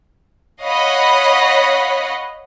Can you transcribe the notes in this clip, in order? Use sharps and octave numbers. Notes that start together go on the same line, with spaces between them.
C#5 D#5 F5 F#5 B5